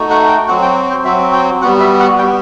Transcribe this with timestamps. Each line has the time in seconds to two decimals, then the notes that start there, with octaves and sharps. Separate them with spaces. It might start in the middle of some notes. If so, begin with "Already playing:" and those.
Already playing: A3 D#4 F#4
0.10 F#5
0.29 G5
0.48 F#3 C4 F#4 F#5
0.62 G5
0.90 C5
1.05 F#3 C4 F#4 E5
1.33 G5
1.62 G3 B3 F#4 F#5
1.80 E5
2.00 F#5
2.18 G3 B3 F#4 G5